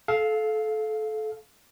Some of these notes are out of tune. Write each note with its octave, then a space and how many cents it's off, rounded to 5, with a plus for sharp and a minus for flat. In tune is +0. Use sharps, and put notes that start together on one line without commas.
A4 -25 F5 +0